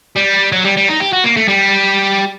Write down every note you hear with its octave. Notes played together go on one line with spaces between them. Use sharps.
G3
F#3
G3
G3
D#4
G4
F#4
A#3
A3
G3